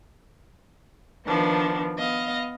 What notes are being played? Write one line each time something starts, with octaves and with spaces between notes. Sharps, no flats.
D#3 F3 B3 D4
B3 D#5 F5